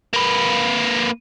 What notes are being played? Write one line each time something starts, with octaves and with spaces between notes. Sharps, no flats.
A#3 B4